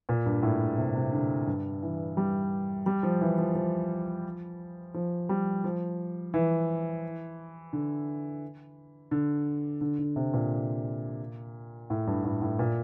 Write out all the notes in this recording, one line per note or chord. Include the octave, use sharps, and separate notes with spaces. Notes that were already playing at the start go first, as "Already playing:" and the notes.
A#2
G2
A2
C3
C3
D3
G2
E3
G3
G3
F3
E3
F3
F3
F3
G3
F3
E3
D3
D3
D3
D3
C3
A#2
A2
G2
A2
A2
A#2